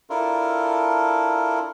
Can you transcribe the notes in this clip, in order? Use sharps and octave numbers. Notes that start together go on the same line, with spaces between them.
D4 E4 F4 A4 A#4